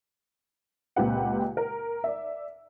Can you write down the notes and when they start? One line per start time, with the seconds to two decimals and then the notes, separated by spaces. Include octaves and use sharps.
0.96 C#2 A#2 C4 G4 B4 F#5
1.57 A#4
2.04 D5 E5